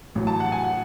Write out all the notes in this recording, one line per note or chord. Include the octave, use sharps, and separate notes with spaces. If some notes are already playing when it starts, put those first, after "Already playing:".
A1 A2 F#3
A5
F#5
G#5
F#5